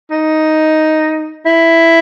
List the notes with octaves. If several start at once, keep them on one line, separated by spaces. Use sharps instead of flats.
D#4
E4